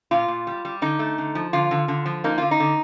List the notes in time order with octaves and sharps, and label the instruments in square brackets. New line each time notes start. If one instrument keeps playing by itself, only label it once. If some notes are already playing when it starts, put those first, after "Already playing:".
[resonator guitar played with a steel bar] A#2 F4
A#2
G3
G3
D3 D#4
A3
D3
F3
D3 F4
D3
D3
F3
A#3 D#4
D3 F4
D#4
D3